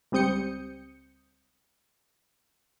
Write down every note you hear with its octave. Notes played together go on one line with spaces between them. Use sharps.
C#2 G3 C4 D#6 G6 C#7